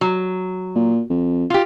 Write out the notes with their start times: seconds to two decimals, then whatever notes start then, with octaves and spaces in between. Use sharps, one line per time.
0.01 F#3
0.75 A#2
1.09 F2
1.50 F4 G4